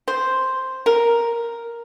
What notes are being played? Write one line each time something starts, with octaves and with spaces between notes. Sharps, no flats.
C5
A#4